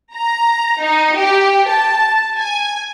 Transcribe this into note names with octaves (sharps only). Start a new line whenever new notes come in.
A#5
D#4
G4
A5
G#5